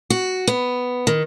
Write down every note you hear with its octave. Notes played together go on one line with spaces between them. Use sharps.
F#4
B3
D#3